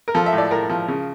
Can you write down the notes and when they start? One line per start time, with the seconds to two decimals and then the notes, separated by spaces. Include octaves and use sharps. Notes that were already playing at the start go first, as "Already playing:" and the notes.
0.08 A#4
0.14 F3 A4
0.26 E5
0.33 A2
0.38 D5
0.51 A2 A#4
0.70 F3
0.88 C#3